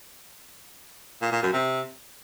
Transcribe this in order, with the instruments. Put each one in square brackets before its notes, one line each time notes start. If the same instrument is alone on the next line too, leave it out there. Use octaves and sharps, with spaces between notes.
[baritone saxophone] A#2
A#2
F#2
C3